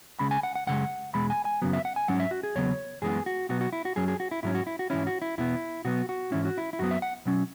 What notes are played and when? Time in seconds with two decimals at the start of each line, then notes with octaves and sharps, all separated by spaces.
0.19 C#2 C#3 G#3 B5
0.31 G#5
0.43 F#5
0.55 F#5
0.67 F#2 C#3 G#3 F#5
1.14 E2 B2 G#3 B5
1.30 G#5
1.45 G#5
1.62 F#2 C#3 F#3 B3
1.73 E5
1.85 F#5
1.96 G#5
2.08 G#2 F#3 C#4 F#5
2.20 E5
2.31 F#4
2.43 G#4
2.55 E2 C#3 F#3 B3 C#5
3.02 F#2 E3 G#3 B3 G#4
3.26 F#4
3.49 B2 F#3 B3 F#4
3.61 F#4
3.73 E4
3.85 F#4
3.96 F#2 F#3 C#4 G#4
4.08 G#4
4.20 F#4
4.31 E4
4.43 G#2 F#3 C#4 E4
4.55 F#4
4.67 E4
4.79 F#4
4.90 G#2 E3 C#4 E4
5.07 F#4
5.22 E4
5.38 E2 B2 B3 E4
5.85 B2 F#3 B3 F#4
6.09 F#4
6.32 G#2 E3 C#4 E4
6.45 F#4
6.58 E4
6.73 E4
6.79 F#2 F#3 B3 F#4
6.91 E5
7.02 F#5
7.25 B2 F#3 C#4